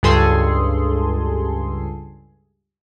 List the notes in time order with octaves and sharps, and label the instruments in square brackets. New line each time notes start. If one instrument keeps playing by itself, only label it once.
[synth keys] C#2 G2 G#4 A4 C6